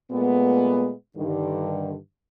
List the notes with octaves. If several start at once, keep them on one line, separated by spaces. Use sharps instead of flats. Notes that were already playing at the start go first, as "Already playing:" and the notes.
A#2 G#3 A3 B3
G2 D3 D#3